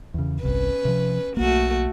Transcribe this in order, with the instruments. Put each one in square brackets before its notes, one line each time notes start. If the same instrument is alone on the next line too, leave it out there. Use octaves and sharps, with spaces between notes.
[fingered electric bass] E2 C#3
[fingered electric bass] G1 C2 C3 [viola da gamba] C#4 B4
[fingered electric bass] C3 F3
[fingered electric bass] B1 A#3 [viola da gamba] A3 F#4